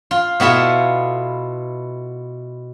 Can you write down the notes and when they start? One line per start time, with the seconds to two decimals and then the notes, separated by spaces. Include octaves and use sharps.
0.11 F4
0.40 B2 B3 E4 F4 A4